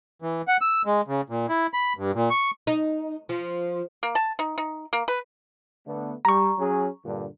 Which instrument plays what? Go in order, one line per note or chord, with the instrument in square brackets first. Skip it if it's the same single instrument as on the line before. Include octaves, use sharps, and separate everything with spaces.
[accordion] E3
F#5
E6
G#3
C#3
A#2
E4
B5
G2
A#2
C#6
[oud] D#4
F3
[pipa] A#3
A5
D#4
D#4
A#3
B4
[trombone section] D3 A3 B3
[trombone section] G3 [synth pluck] A#5 C#6
[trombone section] F#3 C#4 G#4
G2 A#2 D3